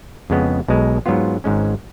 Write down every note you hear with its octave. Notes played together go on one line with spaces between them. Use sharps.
F2 C#3 G#3 B3
B1 B2 G#3
G#2 F#3 B3 F4
G#1 G#2 G#3 C#4